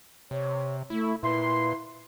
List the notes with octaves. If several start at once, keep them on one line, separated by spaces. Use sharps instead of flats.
C3 C#5
A3 E4
A#2 E4 B4 C6